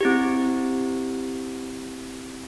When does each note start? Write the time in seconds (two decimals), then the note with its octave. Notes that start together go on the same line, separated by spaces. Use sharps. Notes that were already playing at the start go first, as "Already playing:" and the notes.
0.01 C4 E4 G4